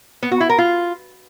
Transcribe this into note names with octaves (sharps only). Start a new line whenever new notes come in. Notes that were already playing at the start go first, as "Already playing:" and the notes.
B3
F#4
E4
A#4
F4